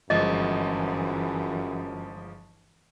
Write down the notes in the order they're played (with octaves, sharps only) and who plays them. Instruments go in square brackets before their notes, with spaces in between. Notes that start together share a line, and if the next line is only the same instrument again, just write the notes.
[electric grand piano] G1 F3 G#3 [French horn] F#2 [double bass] E3 [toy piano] D#5